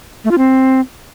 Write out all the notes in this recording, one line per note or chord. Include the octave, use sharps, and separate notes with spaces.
A3
F4
C4